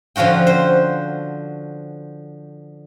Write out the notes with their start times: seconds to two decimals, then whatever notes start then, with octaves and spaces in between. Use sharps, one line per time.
0.16 D3 F3 C#4 F#4 G5
0.47 C5